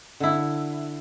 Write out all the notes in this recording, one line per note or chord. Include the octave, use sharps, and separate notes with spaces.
D3 E4